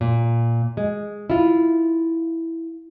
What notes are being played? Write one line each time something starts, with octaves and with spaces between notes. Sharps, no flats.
A#2
G#3
E4 F4